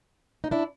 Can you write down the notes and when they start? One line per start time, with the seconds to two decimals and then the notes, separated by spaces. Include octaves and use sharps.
0.44 D#4
0.51 D4 E4